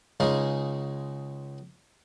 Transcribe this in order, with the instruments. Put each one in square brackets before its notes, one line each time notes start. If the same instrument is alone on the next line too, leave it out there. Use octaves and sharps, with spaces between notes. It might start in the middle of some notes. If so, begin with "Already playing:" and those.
[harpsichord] C#2 G#3 C#4 D#4 G#4 F5